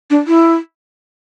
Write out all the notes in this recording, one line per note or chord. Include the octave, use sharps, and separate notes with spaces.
D4
E4